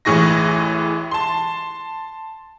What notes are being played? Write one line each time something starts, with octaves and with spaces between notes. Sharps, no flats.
A1 A2 E3 G#4 C#6 A#6
A5 C6